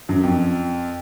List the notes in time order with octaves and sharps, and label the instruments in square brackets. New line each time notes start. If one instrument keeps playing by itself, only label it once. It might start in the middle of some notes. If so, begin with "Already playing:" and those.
[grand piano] F#2
F2